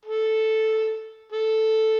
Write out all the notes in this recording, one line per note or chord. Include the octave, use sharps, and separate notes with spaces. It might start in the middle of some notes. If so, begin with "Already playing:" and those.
A4
A4